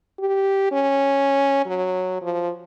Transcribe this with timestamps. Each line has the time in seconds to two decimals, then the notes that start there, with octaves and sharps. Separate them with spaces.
0.19 G4
0.71 C#4
1.66 F#3
2.22 F3